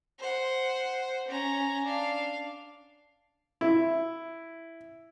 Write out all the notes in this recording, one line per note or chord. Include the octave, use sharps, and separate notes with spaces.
C5 F#5
C#4 A#5
D4 F5
E4